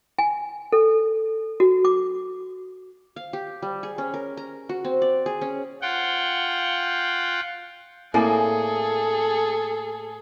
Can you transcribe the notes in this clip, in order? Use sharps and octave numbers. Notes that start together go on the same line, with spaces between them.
G#5
A4
F#4
D6
F5
G4
G3
G#4
C#4
A#4
A#5
F#4
C4
D5
G#4
C#4
F4 F#5 G5
A2 A#3 C4 G#4 A4 D5 G#5